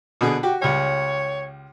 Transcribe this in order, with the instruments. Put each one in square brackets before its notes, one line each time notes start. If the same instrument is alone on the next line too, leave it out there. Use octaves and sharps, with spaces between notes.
[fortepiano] B2 D3 G#4
[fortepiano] F#4 [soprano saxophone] G4
[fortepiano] C#2 G3 [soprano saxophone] C#5